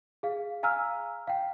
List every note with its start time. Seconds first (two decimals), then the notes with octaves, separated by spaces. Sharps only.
0.23 G#4 F5
0.63 F5 G#5 A#5 E6 F6
1.27 F5 G5